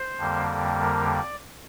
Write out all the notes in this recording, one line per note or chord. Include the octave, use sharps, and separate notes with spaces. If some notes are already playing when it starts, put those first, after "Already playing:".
Already playing: C5
F2 D3 G3 A#3
A#4
D5